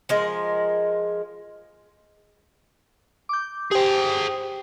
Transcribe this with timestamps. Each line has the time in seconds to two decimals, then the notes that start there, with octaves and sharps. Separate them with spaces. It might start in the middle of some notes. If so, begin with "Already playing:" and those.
0.09 F3 G#3 A#4
3.29 D6 G6
3.71 G4 G#4 C5 G5